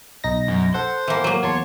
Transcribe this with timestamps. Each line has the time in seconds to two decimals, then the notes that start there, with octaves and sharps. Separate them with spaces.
0.24 B1 D#4 A#6
0.48 F#2
0.74 A4 C5 F#5
1.08 E3 A#3
1.24 F#3 A#3
1.44 E2 C#5 A5 C6